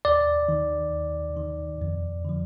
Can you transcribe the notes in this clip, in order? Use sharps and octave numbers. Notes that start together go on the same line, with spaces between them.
D#2 D5
D#3
D#2
D#3
F2
D3 F3